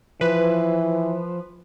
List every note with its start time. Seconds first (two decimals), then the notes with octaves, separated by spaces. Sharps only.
0.21 E3 F3 B4